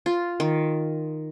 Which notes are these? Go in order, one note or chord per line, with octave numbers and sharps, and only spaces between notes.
F4
D#3